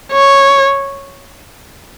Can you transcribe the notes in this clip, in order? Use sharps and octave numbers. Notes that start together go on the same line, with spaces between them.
C#5